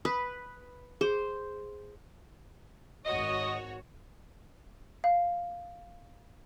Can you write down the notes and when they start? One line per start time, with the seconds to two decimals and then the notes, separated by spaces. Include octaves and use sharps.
0.05 B4 D#6
1.01 G#4 C5
3.05 G#1 F#4 C#5 D#5
5.04 F5